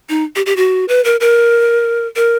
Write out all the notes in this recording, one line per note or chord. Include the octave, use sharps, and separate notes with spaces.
D#4
G4
G4
F#4
B4
A#4
A#4
A#4